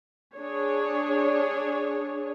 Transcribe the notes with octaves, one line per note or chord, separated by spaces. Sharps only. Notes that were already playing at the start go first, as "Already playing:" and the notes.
D4 G#4 C#5